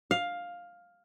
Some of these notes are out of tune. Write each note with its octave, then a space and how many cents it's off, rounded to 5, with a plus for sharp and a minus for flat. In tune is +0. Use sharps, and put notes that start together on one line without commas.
F5 +10